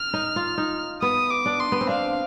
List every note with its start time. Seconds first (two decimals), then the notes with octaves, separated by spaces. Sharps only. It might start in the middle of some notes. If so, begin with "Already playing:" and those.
Already playing: F6
0.14 D#4
0.36 F4
0.58 D#4
1.02 B3 D#6
1.30 D6
1.46 D4
1.60 C6
1.72 B3
1.81 C4
1.89 D4 F5